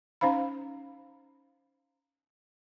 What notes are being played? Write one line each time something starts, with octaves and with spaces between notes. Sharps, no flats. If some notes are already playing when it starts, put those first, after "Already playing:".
C#4 D#4 C5 F5 B5